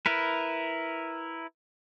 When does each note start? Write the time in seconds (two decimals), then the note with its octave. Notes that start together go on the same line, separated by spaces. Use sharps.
0.06 E4 A#4 B4